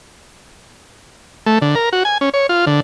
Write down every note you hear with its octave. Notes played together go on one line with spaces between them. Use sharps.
A3
D3
A#4
F#4
G#5
C#4
C#5
F4
D3